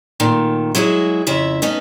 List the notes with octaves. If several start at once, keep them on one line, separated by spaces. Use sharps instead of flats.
A#2 D#3 A3
F#3 G#3 E4 F#4 G#4
F2 C#3 E4 E5
A3 B3 C#4 D#4 D#5